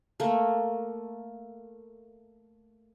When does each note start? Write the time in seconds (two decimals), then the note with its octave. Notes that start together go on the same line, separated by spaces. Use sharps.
0.20 A3 A#3